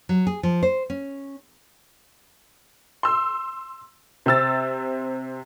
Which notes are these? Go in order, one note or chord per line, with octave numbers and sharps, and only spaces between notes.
F#3
G#4
F3
C5
C#4
C6 E6
C3 C4 E6 A6